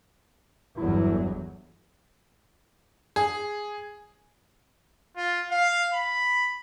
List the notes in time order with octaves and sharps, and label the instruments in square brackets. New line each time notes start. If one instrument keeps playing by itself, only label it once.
[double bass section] G1 E2 F#3 [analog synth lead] E4
[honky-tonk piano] G#4
[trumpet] F4
F5
B5